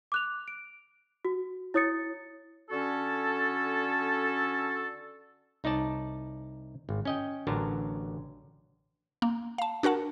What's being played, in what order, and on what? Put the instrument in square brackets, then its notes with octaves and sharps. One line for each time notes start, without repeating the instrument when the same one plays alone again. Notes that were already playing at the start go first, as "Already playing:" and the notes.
[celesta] D6 F#6 F7
D7
F#4
E4 C#5 D#6 A6 C#7
[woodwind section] D3 C#4 F#4 A4
[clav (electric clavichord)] C2 D#4 C#5 D5 A5
G#1
C#4 D#5 G5
A1 D3 F#3 A#4 A5
[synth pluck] A#3
F5 A5
D4 F#4 A#4 F#5 A5